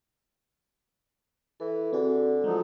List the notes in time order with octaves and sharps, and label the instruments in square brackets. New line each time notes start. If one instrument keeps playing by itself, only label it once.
[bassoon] E3 [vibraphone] A4
[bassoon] D3 [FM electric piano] C4 F#4 G#4
[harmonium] F3 F#3 D#4 [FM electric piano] G#3